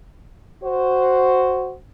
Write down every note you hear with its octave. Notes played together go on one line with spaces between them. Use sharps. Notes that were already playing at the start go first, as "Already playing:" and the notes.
F#4 C5